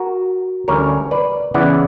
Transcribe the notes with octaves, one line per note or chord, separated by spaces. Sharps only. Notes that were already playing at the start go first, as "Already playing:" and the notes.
Already playing: F#4 A#4
D2 D3 G3 C#4 E4 A#4 C#5
B4 D5
C#3 E3 B3 E4 D5 F#5